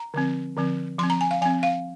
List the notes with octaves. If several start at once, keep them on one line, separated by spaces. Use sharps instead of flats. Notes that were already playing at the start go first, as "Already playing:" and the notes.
Already playing: A#5
D3 F3 C4
D3 F3 C4
F3 C4 C6
A#5
G#5
F5
F3 C4 G#5
F5